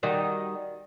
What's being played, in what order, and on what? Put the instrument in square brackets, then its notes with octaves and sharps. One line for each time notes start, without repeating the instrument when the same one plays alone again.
[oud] D#3 G3 F#4